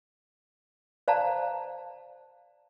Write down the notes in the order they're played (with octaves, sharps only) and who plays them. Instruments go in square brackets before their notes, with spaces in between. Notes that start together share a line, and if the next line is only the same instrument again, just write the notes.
[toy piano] C5 D5 F5 A5 A#5